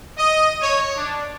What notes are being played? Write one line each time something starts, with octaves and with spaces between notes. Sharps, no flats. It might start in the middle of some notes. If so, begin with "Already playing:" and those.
D#5
C#5
D4